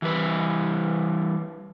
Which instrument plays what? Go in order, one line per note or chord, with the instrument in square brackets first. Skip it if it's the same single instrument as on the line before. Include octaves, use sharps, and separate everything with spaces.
[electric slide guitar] E3 G3 B4